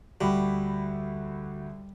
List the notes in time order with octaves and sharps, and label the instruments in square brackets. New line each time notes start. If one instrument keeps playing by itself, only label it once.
[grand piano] D2 F#4 B5 [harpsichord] G3